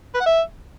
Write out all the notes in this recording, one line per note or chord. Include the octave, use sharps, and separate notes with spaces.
B4
F#5
E5